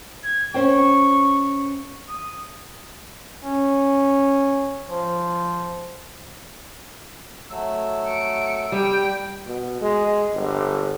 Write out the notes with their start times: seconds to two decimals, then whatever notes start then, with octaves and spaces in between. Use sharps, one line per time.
0.24 G#6
0.54 C#4 C5 G5 C#6
2.09 D#6
3.42 C#4
4.89 F3
7.50 F#3 A3 E6
8.08 C#7 D7
8.72 G3 G5
9.46 B2
9.82 G#3
10.33 G1